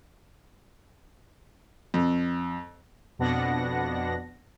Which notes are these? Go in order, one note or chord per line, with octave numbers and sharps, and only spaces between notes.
F2
F2 B2 B3 D4 F#5 A#6